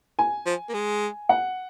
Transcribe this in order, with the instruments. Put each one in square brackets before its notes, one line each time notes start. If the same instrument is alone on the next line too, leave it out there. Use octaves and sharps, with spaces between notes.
[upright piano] G#5
[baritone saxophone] F3
A#3
G#3
[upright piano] F#5